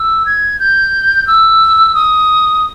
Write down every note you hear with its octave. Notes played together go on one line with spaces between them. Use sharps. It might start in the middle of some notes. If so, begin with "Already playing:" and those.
Already playing: E6
G#6
G6
E6
D#6